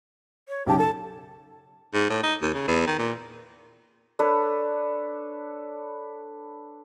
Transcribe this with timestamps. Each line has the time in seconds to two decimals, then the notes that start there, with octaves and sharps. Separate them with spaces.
0.49 C#5
0.66 B1 C#3 G4 A5
0.78 A4 A5
1.94 G#2
2.10 A2
2.23 D#4
2.42 D#2
2.54 C#3
2.68 E2
2.87 D#3
2.99 A#2
4.19 D4 A4 B4 C#5